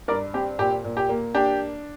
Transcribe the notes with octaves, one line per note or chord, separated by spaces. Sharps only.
G2 A#4 D5
C4 G4
A#2 G4
A#2
G4
A#3
D4 G4